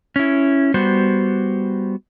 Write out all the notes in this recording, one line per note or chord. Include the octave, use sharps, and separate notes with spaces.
C#4 E4
G3 B3 F#4 C5